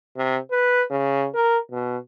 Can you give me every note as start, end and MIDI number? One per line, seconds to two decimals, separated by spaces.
0.17 0.38 48
0.51 0.83 71
0.90 1.27 49
1.34 1.57 70
1.71 1.97 47